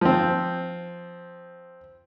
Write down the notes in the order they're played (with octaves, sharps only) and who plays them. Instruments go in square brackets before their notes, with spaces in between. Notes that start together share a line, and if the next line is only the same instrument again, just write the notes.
[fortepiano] F3 C4